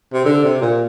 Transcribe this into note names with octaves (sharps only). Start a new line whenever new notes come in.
C3
D3
C3
A#2